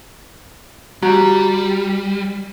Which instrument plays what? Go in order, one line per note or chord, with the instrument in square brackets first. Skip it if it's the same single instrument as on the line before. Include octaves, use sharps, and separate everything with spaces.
[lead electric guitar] G3 [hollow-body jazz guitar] F#4 G4 A#5